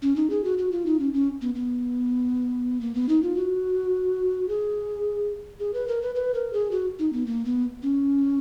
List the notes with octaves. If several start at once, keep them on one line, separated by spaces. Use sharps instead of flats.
C#4
D#4
G#4
F#4
F#4
F4
D#4
C#4
C#4
B3
B3
A#3
B3
D#4
F4
F#4
G#4
G#4
B4
A#4
B4
B4
A#4
G#4
F#4
D#4
B3
A#3
B3
C#4